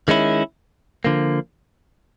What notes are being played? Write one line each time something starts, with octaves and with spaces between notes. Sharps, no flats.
D#3 G#3 C#4 E4
D3 F3 A#3